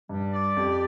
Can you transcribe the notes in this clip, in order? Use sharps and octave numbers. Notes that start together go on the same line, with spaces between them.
G2 G3
D5
F2 G4